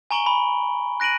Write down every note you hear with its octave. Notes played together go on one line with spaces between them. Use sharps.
G#5 A#5 C#6 D7 F#7 G7
B5
F#6 A#6 D7 D#7 F#7